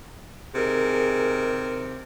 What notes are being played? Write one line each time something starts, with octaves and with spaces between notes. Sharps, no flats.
C3 D#3 G#4 A#4